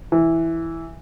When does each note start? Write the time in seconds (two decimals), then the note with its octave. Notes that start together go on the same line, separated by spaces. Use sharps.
0.12 E3